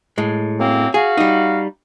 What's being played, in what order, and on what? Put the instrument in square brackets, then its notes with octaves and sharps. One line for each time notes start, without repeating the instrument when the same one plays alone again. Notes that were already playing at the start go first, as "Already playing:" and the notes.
[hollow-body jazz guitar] A2 G#3
[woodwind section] F#2 A#3 C4
[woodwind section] F#4 F5 [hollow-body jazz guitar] G#4
[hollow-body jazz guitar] G3 D#4